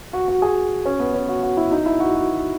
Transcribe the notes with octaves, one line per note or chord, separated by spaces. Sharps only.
F#4
F#4
G#4
C#4
B3
C#4
F#4
F#4
E4
D#4
E4
F#4
F#4